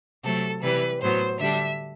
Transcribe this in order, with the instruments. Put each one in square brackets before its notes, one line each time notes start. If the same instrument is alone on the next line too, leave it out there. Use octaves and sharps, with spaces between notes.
[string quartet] C3 F#3 A3 C4 A4
C3 E3 G3 B4
A2 F#3 B3 C5
D3 G3 D4 E5